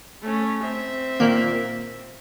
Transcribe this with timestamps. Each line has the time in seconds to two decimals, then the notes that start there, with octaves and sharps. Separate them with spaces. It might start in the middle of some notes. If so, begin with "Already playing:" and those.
0.22 A3 C#4
0.63 C4 E5
1.20 A#2 D#3 A#3